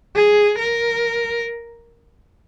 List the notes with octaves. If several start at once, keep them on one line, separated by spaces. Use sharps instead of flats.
G#4
A#4